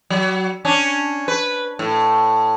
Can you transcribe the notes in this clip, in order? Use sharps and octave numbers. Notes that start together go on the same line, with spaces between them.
F#3
C#4 D4
B4
A2